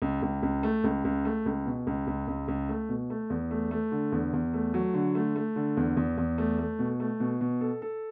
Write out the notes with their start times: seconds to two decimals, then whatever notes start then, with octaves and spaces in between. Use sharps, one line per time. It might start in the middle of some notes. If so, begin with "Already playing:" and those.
0.02 C#2
0.23 C#2
0.43 C#2
0.63 A3
0.84 C#2
1.05 C#2
1.25 A3
1.46 C#2
1.66 B2
1.87 C#2
2.07 C#2
2.28 C#2
2.48 C#2
2.69 A3
2.89 B2
3.10 A3
3.30 E2
3.51 A3
3.71 A3
3.92 D3
4.12 E2
4.33 E2
4.54 A3
4.74 F#3
4.94 D3
5.15 A3
5.36 A3
5.56 D3
5.77 E2
5.97 E2
6.18 E2
6.38 A3
6.59 A3
6.79 B2
7.00 A3
7.20 B2
7.41 B2
7.61 A4
7.82 A4